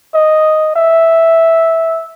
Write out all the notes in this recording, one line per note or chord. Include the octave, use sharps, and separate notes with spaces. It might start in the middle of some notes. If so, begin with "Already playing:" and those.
D#5
E5